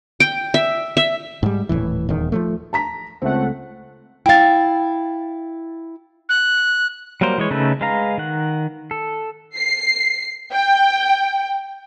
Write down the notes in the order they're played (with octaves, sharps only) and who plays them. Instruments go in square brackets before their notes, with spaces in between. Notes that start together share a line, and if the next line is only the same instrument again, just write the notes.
[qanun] G5
E5
E5
[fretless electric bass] G#2 G3
D#1 C2 A2 E3
D#1 E2 D#3
F3 F#3 A3
[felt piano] A5 A#5 B6
[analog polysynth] C#2 A3 F#5 [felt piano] C4
[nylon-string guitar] E4 F5 [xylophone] G5 A6
[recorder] F#6
[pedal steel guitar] F#3 G3 A#3 A#4 C5
E3 G#3 C#5
C#3 A3 D#4 A4 B4
G#3 B4 F5 A#5
D#3 F#5
A4
[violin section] C7
G5